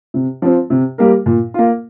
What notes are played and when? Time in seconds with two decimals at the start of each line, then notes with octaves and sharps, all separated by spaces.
0.14 C3
0.42 F3 C4
0.70 C3
0.98 G3 A#3 G4 A#4
1.26 A#2
1.54 A#3 F4